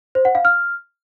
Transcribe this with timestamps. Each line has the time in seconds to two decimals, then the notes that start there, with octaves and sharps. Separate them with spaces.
0.15 C5
0.25 F#5
0.35 F5
0.45 F6